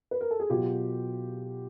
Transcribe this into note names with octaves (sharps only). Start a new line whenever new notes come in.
B4
A#4
A4
G#4
B2 F#3 F4 G4